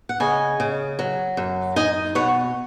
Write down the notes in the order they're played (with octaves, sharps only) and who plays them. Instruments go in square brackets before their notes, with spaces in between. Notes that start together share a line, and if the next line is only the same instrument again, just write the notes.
[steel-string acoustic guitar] F#5
C#3 D#5 G#5
C#3
F#3
F#2
D#4 D#5 G#5
B2 C#5 F#5